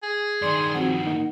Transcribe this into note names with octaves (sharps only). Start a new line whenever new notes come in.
G#4
G2 D#3 D5 C6
F3 C4 F#4 F#5
A#3 D#4